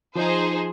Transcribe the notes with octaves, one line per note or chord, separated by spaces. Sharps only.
F3 D#4 G#4 C5